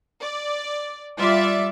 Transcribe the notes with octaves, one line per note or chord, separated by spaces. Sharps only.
D5
G3 F4 D5 E5